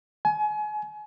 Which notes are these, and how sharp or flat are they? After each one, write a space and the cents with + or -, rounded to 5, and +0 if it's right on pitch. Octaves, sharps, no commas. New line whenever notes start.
G#5 +30